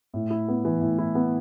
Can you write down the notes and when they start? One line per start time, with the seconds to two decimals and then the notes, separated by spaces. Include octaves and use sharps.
0.14 A2
0.30 E4
0.48 B3
0.65 E3
0.81 A2
0.98 E4
1.15 B3